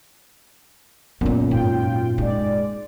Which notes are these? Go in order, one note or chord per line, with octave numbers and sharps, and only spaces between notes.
F#2 A#2 B3 C#4
G#2 F4 G5
G#3 D#4 D5